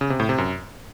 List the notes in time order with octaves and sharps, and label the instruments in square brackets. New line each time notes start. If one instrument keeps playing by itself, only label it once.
[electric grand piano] C#3
C3
A2
C3
F#2